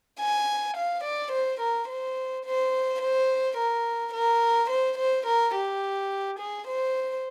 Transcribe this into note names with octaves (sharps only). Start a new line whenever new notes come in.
G#5
F5
D5
C5
A#4
C5
C5
C5
A#4
A#4
C5
C5
A#4
G4
G#4
C5